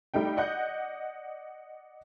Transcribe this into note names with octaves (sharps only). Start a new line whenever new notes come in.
G3 A3 D#4 G5
D5 D#5 F#5 F#6 G6